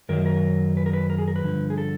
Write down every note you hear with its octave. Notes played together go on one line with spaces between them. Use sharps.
F#2 D#3 F#3 A#4
A#4
B4
A#4
B4
A#4
G#4
A#4
B4
G2 D3 F3
G#4
A4